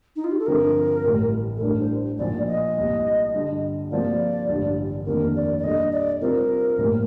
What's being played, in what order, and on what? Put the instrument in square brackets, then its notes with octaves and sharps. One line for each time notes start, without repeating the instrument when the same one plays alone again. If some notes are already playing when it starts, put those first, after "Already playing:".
[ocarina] D#4
F4
G4
A4
[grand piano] G2 D3 F3 C4 G4 [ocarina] A#4
[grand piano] A1 A2 G3
[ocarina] A4
[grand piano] A2 G3 D4 [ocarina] A#4
[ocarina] C5
[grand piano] A#1 A#2 F3 A#3 D#4 [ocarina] D5
[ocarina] D#5
[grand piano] C2 A#2 G3
G2 D3 G3
[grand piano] C3 F3 A#3 F4 A#4 [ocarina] D5
[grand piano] A1 G2 D3 G3
[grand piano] F2 D#3 A#3 D4 [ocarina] A#4
[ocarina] D5
D5
[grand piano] A#2 G3 D4 A4 [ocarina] D#5
[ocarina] D5
[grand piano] C3 G3 C4 F4 C5 [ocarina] A#4
[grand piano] A#1 A2 G3